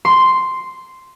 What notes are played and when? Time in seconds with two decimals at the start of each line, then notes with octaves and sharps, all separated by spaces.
0.05 C6